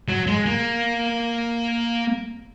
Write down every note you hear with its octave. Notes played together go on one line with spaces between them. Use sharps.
F#3
G#3
A#3